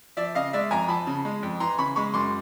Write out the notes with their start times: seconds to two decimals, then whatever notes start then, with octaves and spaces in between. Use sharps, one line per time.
0.17 F3 D5 E5
0.35 C#3 D#5 F5
0.53 G#3 D5 E5
0.71 F2 G#5 A#5
0.88 F3 A5 B5
1.07 C#3
1.25 G#3
1.43 F2
1.60 E3 A#5 C6
1.78 C#3 B5 C#6
1.96 G#3 B5 C#6
2.14 F#2 C6 D6